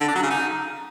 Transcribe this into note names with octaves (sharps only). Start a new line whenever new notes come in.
D3
D4
F#3
C#3
D#4